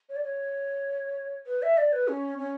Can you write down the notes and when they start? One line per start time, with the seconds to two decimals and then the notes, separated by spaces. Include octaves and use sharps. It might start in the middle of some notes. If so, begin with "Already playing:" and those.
0.09 C#5
0.16 D5
0.23 C#5
1.46 B4
1.62 E5
1.77 D5
1.93 B4
2.08 C#4
2.38 C#4